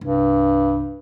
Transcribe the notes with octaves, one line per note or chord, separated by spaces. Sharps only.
C2 G2